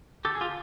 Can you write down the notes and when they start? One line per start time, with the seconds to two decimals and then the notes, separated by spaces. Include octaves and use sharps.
0.25 D3 G4 A4
0.35 G#4
0.41 F4 G4